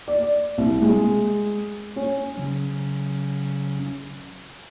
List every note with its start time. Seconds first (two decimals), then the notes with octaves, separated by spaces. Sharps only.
0.08 D5
0.58 C2
0.82 G#3
1.96 C#4
2.36 C#3 F#3 C#4